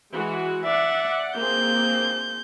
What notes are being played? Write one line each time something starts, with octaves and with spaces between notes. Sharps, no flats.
E3 G#3 F#4
D5 E5 F#5
A#3 C4 G#4 G6